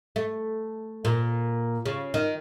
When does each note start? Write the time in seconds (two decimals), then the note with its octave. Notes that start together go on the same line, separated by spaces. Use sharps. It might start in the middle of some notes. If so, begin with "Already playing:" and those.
0.16 A3
1.05 A#2
1.86 C#3
2.14 D#3